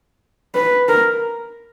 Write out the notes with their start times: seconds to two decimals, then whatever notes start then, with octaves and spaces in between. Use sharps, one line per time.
0.55 B4
0.88 A#4